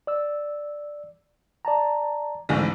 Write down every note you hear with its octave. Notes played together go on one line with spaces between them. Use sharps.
D5 E6
D5 A5 A#5
A1 D2 G#2